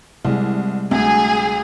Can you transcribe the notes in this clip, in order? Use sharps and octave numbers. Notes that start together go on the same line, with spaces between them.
C2 C3 G3 G#3
D2 G#4